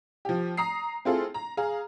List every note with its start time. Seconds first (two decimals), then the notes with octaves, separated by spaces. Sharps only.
0.25 F3 G4
0.57 A#5 D#6 C7
1.05 C4 E4 F4 G#4 A4
1.34 A#5
1.57 G#4 F5 A#5